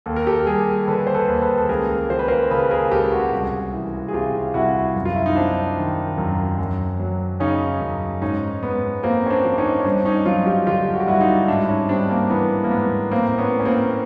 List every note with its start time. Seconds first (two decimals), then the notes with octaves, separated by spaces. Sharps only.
0.06 D#2 A4
0.16 A#4
0.27 G4 A4
0.46 G3 G#4 A#4
0.87 D3 A4 B4
1.07 C5
1.14 A4 B4
1.28 D#2
1.42 A4 B4
1.57 A4
1.69 C#2 G#4 A#4
2.10 F3 C5
2.19 B4
2.28 A#4 C5
2.51 C#3 A4 B4
2.71 G#4 A#4
2.92 C#2 G4 A4
3.12 F#4 G#4
3.32 C2
3.74 E3
4.08 G#4
4.13 C3 F4 G4
4.54 C2 E4 F#4
4.96 F#2
5.05 F4
5.15 E4
5.26 D#4
5.36 F#3 C4 D4
5.77 D#3
6.18 F#2
6.59 F#2
7.00 F#3
7.40 C#3 C#4 D#4
7.81 F#2
8.21 G#2 C#4 D#4
8.62 G#2 B3
9.03 F3 A#3 C4
9.26 C#4
9.30 C4 D4
9.44 F3
9.58 C#4 D#4
9.80 C#4
9.85 G2 C4 D4
10.05 C#4 D#4
10.26 F#3 D#4 F4
10.46 F4 G4
10.67 D3 F4 G4
10.94 F#4
11.00 G4
11.07 G2 E4 F#4
11.21 D#4 F4
11.48 G#2 D4 E4
11.68 C#4 D#4
11.89 G3 C4 D4
12.10 A#3 C4
12.30 E3 B3
12.64 A#3
12.71 G#2 B3
13.11 A2 A#3 C4
13.38 B3 C#4
13.52 A2
13.60 C#4
13.65 A#3 C4